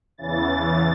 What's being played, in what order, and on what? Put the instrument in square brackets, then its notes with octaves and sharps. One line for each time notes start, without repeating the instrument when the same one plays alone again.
[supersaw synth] E2 C#3 E3 A6